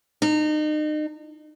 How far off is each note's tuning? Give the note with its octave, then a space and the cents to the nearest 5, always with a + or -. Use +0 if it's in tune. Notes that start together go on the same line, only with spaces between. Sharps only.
D#4 -35